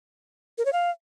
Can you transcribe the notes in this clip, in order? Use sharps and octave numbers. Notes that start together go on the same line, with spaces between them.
A#4
C#5
F5